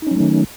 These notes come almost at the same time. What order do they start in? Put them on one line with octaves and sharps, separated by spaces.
D#4 C#4 F#3 A3 D#3